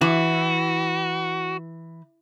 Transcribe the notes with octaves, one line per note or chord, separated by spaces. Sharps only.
E3 F#4